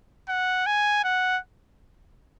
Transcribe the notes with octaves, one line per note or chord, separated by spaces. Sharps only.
F#5
G#5
F#5